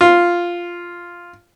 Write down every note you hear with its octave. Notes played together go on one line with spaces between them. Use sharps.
F4